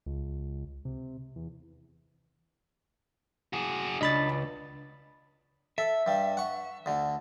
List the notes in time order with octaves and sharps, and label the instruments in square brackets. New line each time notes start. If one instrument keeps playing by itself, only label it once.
[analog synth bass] C#2
C3
E2
[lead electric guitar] F#4 G#4
[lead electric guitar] C#2 [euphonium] D4 [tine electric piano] D#5 B5 A6
[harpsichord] A4 [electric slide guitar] E5
[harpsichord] G2 G3
F#5 C#6
D2 D3